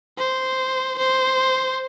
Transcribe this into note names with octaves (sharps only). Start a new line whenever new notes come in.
C5
C5